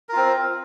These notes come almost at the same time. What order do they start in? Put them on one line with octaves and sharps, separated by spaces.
A#4 F4 C4